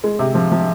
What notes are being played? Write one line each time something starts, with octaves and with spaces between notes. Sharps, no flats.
G#3
C3
F3
F3